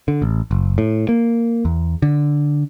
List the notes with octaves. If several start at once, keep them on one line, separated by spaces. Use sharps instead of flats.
D3
A1
F#1
A2
A#3
E2
D3